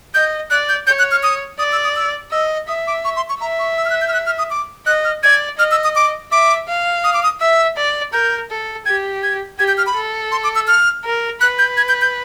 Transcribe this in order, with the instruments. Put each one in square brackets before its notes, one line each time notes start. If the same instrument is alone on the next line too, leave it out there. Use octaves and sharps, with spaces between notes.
[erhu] D#5 [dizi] G6
[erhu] D5 [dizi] F#6
[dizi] G6
[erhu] C#5 [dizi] G6
[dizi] F#6
F6
D#6
[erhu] D5 [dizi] D#6
[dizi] E6
D#6
E6
[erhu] D#5 [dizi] E6
[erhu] E5 [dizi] D#6
[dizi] D6
C#6
C6
C#6
[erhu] E5 [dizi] A#5
[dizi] C#6
E6
F6
F#6
G6
F6
F#6
F6
D#6
D6
[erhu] D#5 [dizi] F#6
[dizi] F6
[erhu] D5 [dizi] G#6
[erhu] D#5 [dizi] F6
[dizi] E6
D#6
D6
[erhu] E5 [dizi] D6
[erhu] F5
[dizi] D#6
D6
D#6
[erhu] E5 [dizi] E6
[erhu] D5
[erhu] A#4 [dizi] G6
[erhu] A4
[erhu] G4 [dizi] G#6
[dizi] G#6
[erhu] G4 [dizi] G#6
[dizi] G6
F6
B5
[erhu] A4
[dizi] C6
D6
E6
F6
[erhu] A#4
[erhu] B4 [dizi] F#6
[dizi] G6
G#6
G6
G6